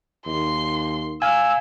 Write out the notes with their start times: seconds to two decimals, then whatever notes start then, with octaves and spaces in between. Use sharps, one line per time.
0.26 D#2 C6
1.22 F5 G#5 E6 F6 G#6